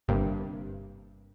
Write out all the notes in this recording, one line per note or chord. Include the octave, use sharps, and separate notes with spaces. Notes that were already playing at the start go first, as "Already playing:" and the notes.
G1 G2 C3 A#3